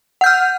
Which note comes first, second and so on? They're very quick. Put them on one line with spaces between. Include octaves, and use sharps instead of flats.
F#5 G6 F6